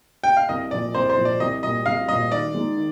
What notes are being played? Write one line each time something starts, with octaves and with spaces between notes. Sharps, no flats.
G5
F5
C2 D#5
A#2 F3 D5
C2 C5
C5
A#2 F3
D5
C2 D#5
A#2 G3 D#5
C2 F5
A#2 G3 D#5
D#3 D5
G#3 D#4
D#3